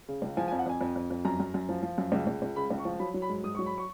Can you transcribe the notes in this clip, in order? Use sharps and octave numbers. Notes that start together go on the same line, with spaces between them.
C#3
C#2
F3 G#5
G#5
F2
F#5
F2 G#5
F2
F2
F2
F#2 A#5
F#2
F#2
F3
F3
F#2
C#2
C#2
C#2
C#3 B5
C#2
C#6
F3
F#3 B5
F#3
B5
G#2
G#2 D#6
F#3 C#6
B5
C#6